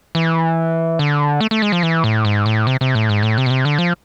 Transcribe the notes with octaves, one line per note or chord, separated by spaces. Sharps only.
E3
D3
A3
A3
G#3
F3
E3
A2
G#2
A2
C3
C3
A2
G#2
A2
C3
B2
C3
D3
F3